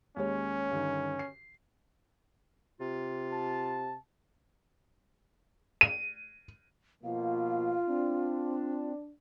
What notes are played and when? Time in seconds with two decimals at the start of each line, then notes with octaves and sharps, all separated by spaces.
0.17 D#2 G#3 C#4 C#5
0.71 G2 D3 D#3
1.19 C7
2.80 C3 F4
3.32 A5
5.81 D#7
7.04 B2 F3 A#3 F4 F5
7.87 C4 D4